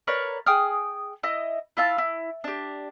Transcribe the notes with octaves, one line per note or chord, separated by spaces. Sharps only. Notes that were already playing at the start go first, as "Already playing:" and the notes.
A#4 B4 C#5 D5
G#4 G5 D#6 F6
E4 D#5
E4 F4 A5 E6
E4
D4 G4